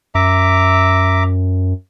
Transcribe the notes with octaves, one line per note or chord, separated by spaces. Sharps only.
F#2 E5 A#5 D6